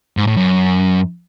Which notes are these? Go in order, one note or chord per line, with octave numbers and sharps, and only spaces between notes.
G#2
A2
F#2